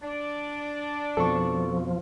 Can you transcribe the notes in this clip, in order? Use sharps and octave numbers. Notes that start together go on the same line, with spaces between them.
D4 D5
F2 B2 F3 A4 C#6